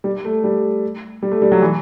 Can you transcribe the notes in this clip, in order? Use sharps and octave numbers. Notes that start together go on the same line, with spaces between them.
G3
A3
G3
G3
A3
G3
F#3
E3